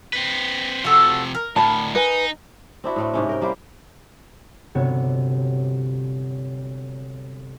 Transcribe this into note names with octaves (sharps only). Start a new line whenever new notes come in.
C4 B4
C3 F3 F#4 A4
A#4
D2 A2 A5 B5
D#4 B4 G#5
C4 D4 E4 F#4
A2 A3 C4
G#2 C3 C#4
A#4 G5
G3 A#3 E4 C5
G1 C3 F#3 B3 C#5